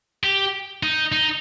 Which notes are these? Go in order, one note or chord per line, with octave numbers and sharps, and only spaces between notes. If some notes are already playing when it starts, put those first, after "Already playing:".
G4
D#4
D#4